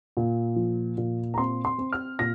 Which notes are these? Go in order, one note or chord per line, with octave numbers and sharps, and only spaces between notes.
A#2
F3
A#2
A#5
C4 C6
C6
C4
F6
A#2 A#6